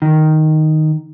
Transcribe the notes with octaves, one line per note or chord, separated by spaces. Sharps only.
D#3